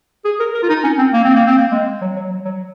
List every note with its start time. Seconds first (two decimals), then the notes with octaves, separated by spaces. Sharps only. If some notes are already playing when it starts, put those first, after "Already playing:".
0.25 G#4
0.40 A#4
0.54 A#4
0.63 F4
0.69 D#4
0.84 C#4
0.98 C4
1.13 A#3
1.25 C4
1.35 A#3
1.47 C4
1.58 A#3
1.71 G#3
2.01 F#3
2.16 F#3
2.30 F#3
2.45 F#3